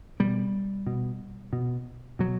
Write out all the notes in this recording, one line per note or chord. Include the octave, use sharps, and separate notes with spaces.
B2 G3
B2
B2
B2 F#3